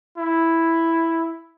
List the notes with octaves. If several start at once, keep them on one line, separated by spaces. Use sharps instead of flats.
E4